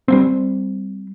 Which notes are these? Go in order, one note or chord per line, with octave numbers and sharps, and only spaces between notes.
G3 A#3 C4